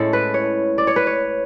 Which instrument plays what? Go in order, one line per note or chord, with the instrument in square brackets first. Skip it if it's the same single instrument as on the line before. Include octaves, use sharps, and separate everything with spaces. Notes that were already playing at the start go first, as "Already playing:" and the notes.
Already playing: [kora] A2 G#3 C#4 E4 A4
B4
C#5
D5
C#5
B4
C#5